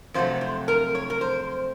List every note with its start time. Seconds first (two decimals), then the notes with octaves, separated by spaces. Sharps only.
0.14 F2 C3 F#3 A3 C5
0.41 C5
0.68 A#4
0.95 C#5
1.10 A#4
1.21 C5